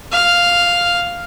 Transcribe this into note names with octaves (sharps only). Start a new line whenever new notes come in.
F5